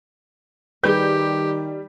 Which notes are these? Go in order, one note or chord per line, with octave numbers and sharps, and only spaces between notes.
D#3 G3 G4 G#4 B4 G6